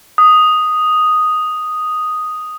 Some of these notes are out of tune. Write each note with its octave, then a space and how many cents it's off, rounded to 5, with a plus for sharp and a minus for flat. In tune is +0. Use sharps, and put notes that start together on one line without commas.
D#6 +0